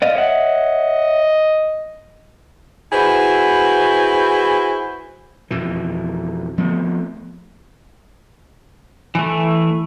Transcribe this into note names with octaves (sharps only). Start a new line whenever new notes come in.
D5 D#5 F5
C#5 D#5 E5 F#5
E4 F#4 G#4 B4 C5
F2 B2 E3
F3 A3 B3 C4
E3 A3